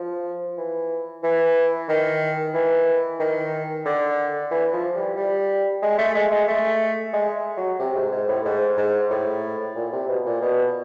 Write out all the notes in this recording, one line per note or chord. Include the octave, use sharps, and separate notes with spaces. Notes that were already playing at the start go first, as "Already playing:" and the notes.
Already playing: F3
E3
E3
D#3
E3
D#3
D3
E3
F3
G3
G3
G#3
A3
G#3
G#3
A3
G#3
F#3
C3
G#2
G#2
A2
G#2
G#2
A2
A#2
C3
B2
A#2
B2